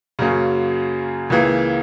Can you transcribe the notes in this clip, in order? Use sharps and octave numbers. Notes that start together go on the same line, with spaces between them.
F#2 C#3 F#3 A#3 C#4
C#2 C#3 E3 A#3